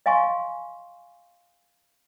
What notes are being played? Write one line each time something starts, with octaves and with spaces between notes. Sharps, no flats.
D#5 F5 G#5 C6 C#6